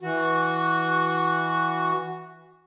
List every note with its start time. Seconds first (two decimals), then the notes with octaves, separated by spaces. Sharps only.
0.01 E3 F#4